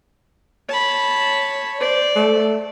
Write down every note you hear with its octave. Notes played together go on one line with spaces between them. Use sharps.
C#5 A5 B5
C5 D5
A3